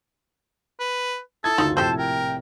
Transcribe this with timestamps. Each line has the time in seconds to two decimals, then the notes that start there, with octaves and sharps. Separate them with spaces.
0.80 B4
1.44 E4 A4 A5 D#6 G#6
1.58 F#1 D2 D#4 F4
1.77 A#1 A2 C3 C4 G4 A4 C5 A5
1.98 A#4 G5